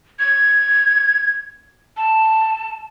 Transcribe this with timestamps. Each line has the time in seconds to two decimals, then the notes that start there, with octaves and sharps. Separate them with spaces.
0.19 G#6
1.97 A5